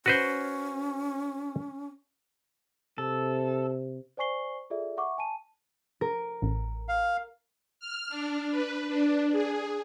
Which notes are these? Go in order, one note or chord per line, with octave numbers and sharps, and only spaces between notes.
C#4 F#4 B4 C5
C3 A4
C5 D5 G#5 C#6 C7 G7
F4 G#4 A4 D5 E5
E5 F#5 C#6 D6
G#5 A5 D#7
A#4
A1
F5
F6
D4
B4
D4
G#4